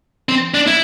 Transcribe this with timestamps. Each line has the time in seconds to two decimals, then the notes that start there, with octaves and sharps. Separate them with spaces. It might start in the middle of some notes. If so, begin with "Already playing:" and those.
0.29 C4
0.54 D4
0.67 E4